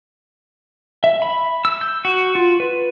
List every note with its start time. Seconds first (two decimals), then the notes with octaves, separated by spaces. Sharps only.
1.04 E5
1.22 B5
1.65 E6
1.81 G6
2.05 F#4
2.35 F4
2.60 B4